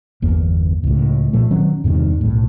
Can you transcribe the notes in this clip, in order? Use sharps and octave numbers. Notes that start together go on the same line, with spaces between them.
G1 E2 A#3
C#2 A2
A#2 F3 A3
D#3 F#3 C4 C#4
E2 G2 C3 D#3
B1 A2